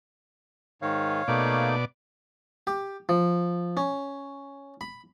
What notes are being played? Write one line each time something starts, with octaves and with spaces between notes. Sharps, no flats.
G#2 D#3 C#5 F5
B2 A3 A#3 D#4 D5
G4
F3
C#4
B5